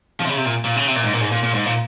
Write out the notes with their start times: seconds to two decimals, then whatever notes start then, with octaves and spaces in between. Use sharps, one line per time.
0.20 F3
0.25 C3
0.29 C#3
0.37 C3
0.46 A#2
0.65 A#2
0.76 C#3
0.87 C3
0.96 A#2
1.04 G#2
1.13 A#2
1.21 G#2
1.32 A#2
1.43 A#2
1.54 G#2
1.66 A#2